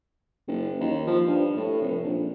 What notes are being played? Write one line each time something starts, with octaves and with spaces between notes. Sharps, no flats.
F#1
D#2
F3
G2
A2
F1
A#1